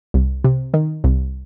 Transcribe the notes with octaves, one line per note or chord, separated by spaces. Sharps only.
C2
C3
D#3
C2